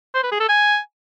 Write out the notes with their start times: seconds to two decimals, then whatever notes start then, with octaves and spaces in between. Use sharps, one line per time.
0.15 C5
0.23 B4
0.32 G#4
0.40 A4
0.49 G#5